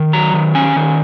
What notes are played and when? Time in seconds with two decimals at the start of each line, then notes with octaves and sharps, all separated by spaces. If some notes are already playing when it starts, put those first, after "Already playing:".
Already playing: D#3
0.13 F#3 A#5
0.34 D#3
0.55 C#4 G#5
0.76 D#3